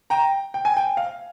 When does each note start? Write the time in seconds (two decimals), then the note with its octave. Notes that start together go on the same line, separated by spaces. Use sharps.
0.10 G5 A#5
0.54 G5
0.65 G#5
0.77 G5
0.97 F5